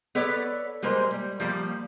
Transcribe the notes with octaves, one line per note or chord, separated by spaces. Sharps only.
B3 A4 B4 C#5 D5
G3 G#3 A#3 A#4 C5
G3
F3 G3 A#3